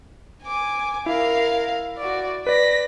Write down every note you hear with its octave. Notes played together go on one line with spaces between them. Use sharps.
G#5 D6
E4 A#4 F5
F#4 D5
B4 D5 A#6 B6